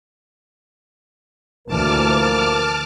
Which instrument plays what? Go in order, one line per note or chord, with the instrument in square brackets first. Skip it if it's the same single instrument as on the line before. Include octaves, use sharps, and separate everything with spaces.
[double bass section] D2 E3 [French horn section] A#2 F3 A#4 [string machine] A5 D6 F6